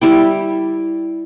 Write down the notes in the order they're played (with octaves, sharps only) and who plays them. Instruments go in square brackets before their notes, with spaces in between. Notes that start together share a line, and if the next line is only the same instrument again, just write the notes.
[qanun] G3 E4 G5